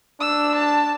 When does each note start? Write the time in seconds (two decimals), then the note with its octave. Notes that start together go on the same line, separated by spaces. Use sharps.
0.21 D4 E6
0.56 A5